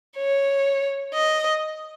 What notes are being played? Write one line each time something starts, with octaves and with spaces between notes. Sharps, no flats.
C#5
D#5